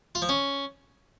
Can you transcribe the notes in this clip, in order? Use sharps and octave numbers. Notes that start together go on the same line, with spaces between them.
F4
F3
C#4